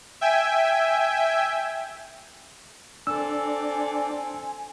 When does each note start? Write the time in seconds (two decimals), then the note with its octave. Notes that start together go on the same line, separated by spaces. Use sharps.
0.21 E5 G5 G#5
3.07 C4 D4 A4 G#5 E6